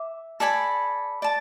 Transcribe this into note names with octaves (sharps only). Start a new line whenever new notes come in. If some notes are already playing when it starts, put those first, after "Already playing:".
Already playing: E5 D6
A4 D5 G#5 B5
D5 A5